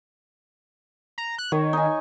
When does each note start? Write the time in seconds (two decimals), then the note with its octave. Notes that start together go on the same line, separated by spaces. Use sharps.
1.18 A#5
1.38 F#6
1.52 D#3 C#5
1.73 D#4 G#5